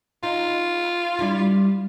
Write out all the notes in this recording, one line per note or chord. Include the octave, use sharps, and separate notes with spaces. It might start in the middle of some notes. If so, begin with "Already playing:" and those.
D#4 F4
G3 D4 E4